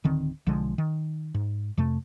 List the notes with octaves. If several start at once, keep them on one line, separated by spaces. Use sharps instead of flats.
D1 D3 D#3 C4
B1 D3 F3 G#3
D#3
G#2
F2 C3 A3